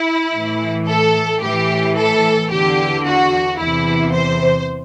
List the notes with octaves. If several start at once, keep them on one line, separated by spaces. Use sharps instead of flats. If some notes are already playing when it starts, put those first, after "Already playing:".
Already playing: E4
A2 E3
A4
A2 E3 G4
A4
E2 D3 G4
F#4
E2 C3 E3 E4
C5